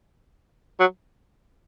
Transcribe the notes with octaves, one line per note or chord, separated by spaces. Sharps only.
F#3